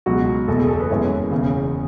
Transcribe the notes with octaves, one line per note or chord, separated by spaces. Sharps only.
C#2 B2 F#3 F#4
F#1 E2 B2 A4
G#4
A4
B4
F#2 E3 G#3 B3 C#5
E1 E2 C#3